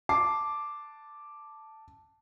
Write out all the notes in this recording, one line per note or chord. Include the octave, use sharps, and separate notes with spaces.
A5 D6 C7